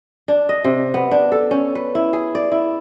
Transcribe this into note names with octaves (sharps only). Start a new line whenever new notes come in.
D4
D#5
C3
B3
D4
A4
C#4
B4
E4
G#4
D5
E4